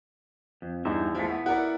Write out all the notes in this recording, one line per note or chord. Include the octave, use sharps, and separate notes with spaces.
F2
E2 G2 D#4 E5
F3 G#3 A3 E4
B3
E4 A#4 D5 F#5